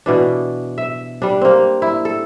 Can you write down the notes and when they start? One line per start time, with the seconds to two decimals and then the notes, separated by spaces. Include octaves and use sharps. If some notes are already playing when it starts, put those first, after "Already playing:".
0.06 B2 E3 D4
0.78 E5
1.22 G3 D4
1.42 A#3 C4
1.82 E4
2.05 A4